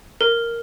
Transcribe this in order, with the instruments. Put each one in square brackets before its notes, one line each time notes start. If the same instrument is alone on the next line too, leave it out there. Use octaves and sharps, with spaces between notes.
[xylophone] A#4